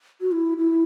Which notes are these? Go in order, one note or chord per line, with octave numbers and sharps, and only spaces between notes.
F#4
E4
E4